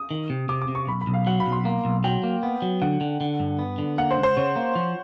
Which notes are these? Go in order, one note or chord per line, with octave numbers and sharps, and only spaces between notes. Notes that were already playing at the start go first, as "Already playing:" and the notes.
Already playing: D#6
D#3
C3
C3 D6
D6
C3
C#6
B1 B5
B5
B1
F5
F#3 F#5
B5
B1
C6
A#3
B1
F#3 G5
A#3
B3
F#3
D3 F#5
D3
D3
G2
B3
D3
A#3 F#5
C5
C#2
C5
C#3 C#5
A#3
F3